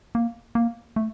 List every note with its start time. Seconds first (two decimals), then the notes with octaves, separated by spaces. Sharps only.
0.15 A#3
0.55 A#3
0.96 A3